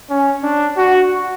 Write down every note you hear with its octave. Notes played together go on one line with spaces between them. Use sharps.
C#4
D4
F#4